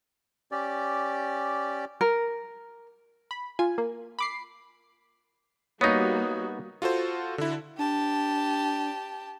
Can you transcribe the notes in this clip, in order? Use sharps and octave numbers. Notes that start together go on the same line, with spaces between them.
C#4 G4 D5
A#4
B5
F4 G#5
A#3
B5 D6 C7
G3 A#3 B3 D#4 F#4 C#5 D#6 A#6
F4 F#4 A4 C5
D3 E4
D4 G4 A5